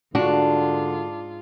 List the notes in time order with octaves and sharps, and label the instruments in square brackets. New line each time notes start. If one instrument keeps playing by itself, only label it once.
[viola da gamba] G#2 F4 [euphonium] D3 [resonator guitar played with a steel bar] D4 [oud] F#4